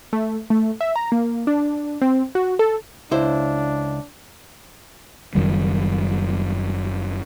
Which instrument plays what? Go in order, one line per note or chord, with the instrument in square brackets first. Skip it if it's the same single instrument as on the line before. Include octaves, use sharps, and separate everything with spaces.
[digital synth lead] A3
A3
E5
A#5
A#3
D4
C4
F#4
A4
[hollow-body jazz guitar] C#2 E4 C5 [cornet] D4
[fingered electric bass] F#1 F#2 D#3 G3